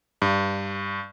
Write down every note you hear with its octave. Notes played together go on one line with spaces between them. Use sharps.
G2